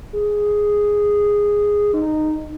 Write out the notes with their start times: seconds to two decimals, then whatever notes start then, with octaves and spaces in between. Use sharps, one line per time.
0.14 G#4
1.93 D#4